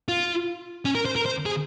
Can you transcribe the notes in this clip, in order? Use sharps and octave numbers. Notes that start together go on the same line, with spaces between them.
F4
C#4
A#4
C5
A#4
C5
G#4